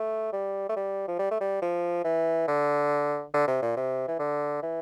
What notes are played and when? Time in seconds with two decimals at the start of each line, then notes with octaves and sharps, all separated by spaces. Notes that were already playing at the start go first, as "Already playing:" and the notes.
Already playing: A3
0.33 G3
0.69 A3
0.77 G3
1.08 F3
1.19 G3
1.31 A3
1.41 G3
1.62 F3
2.04 E3
2.48 D3
3.34 D3
3.47 C3
3.62 A#2
3.77 C3
4.08 E3
4.19 D3
4.63 E3